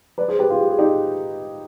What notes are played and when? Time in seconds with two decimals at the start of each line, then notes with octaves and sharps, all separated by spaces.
0.18 B4 D5
0.28 G#4 C5
0.39 G4 B4
0.50 F4 G#4
0.61 G4
0.70 G#4
0.79 D#4 G4